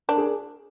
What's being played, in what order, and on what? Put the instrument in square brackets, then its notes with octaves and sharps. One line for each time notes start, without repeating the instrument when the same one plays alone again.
[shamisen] D4 [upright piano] A#4
[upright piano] G#4